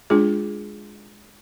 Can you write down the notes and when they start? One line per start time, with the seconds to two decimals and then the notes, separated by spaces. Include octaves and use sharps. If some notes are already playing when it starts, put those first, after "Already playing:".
0.10 G#3 D4 F4 G#4